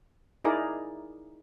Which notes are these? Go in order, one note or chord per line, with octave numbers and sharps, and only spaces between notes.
D#4 E4 G#4 A#4 D5